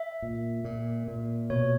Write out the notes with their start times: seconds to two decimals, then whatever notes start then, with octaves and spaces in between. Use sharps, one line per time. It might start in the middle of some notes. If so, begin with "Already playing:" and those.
Already playing: E5
0.22 A#2
0.65 A#2
1.08 A#2
1.50 B2 C#5